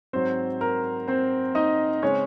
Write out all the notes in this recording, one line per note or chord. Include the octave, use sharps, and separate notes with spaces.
G#2 F#3 C4 C5
A#4
C4 C5
D#4 D#5
C#3 G#3 C4 C#4 C#5